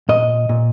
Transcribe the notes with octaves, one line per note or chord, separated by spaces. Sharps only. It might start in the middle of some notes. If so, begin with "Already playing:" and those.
A#2 D#5
A#2